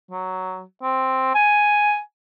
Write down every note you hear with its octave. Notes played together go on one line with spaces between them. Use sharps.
F#3
C4
G#5